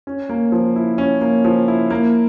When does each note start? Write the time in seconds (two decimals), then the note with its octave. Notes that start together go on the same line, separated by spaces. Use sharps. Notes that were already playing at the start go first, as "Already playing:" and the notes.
0.07 C#4
0.29 A#3
0.52 F3
0.76 E4
0.98 C#4
1.21 A#3
1.45 F3
1.68 E4
1.91 A#3